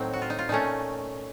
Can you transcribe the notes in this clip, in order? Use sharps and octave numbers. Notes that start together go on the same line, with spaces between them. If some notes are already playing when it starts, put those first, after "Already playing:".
Already playing: A2 F#3 C4 D#4
F#4
F4
D#4
F4
A#2 A3 C#4 D#4